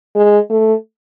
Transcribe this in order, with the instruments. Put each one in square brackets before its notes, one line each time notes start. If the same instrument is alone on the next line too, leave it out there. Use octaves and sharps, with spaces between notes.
[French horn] G#3
A3